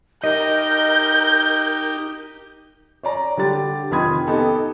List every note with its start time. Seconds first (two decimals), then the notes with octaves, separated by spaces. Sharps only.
0.24 D#4 G4 A#4 D#5 G6
3.03 C#5 D5 A#5
3.37 D3 G3 G4 A6
3.91 F1 D#3 F4 B5 D#6 G#6
4.27 B3 D#4 G4 A4